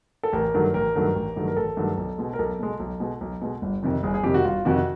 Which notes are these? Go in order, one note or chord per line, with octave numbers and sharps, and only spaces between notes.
A4
A1 A#4
G2 D#3 F#3 A3
A1 A#4
G2 D#3 F#3 A3
A1
G2 D#3 F#3 A3
A#4
A1 A4
G2 D#3 F#3 A3
B1
B2 G#3
A#4
B1 A4
B2 G#3
B1
B2 G#3
B1
B2 G#3
G1
F2 C3 D#3
G1 G#4
G#4
F2 C3 D#3 G4
F#4
G1 F4
F2 C3 D#3 F#4